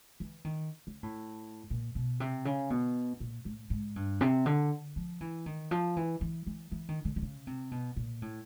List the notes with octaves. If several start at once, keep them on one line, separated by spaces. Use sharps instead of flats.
E3
D#3
C#3
A2
A#2
B2
C3
C#3
B2
A#2
A2
G#2
G2
C3
D3
F3
E3
D#3
F3
E3
E3
E3
E3
D#3
D3
D3
C#3
C3
B2
A#2
A2